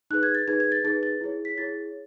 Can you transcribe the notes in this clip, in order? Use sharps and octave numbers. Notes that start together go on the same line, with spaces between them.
D#4 G#4 B4 F#6
G#6
A6
D#4 G#4 B4 G#6
G#6
A6
D#4 G#4 B4 A6
A6
E4 G#4 C#5
B6
E4 G#4 C#5 A6